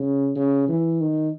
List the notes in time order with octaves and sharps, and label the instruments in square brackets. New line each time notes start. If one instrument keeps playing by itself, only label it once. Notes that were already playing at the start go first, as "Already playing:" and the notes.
Already playing: [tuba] C#3
C#3
E3
D#3